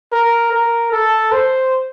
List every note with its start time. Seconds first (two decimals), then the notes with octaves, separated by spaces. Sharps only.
0.12 A#4
0.52 A#4
0.92 A4
1.32 C5